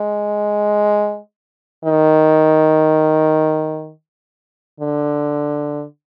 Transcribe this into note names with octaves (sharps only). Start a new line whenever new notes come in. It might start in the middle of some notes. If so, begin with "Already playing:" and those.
Already playing: G#3
D#3
D3